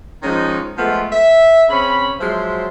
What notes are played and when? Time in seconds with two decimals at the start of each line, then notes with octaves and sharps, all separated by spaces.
0.22 D#3 F3 G#3 C#4 D#4
0.77 F3 G#3 A3 B3 F4
1.11 E5
1.69 C#3 C4 C#4 B5
2.19 F3 F#3 G#3 C5 E5